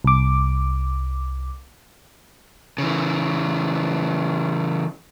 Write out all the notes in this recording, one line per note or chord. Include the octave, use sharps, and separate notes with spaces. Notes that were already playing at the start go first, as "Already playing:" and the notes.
C2 D6
C#3 E3